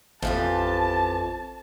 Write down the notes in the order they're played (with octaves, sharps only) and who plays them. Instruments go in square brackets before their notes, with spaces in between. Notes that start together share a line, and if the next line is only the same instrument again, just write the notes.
[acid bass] A1 [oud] F2 [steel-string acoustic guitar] E3 F4 G4 [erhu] A5